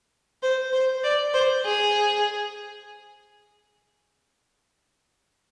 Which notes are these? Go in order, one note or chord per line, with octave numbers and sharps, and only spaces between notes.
C5
C5
D5
C5
G#4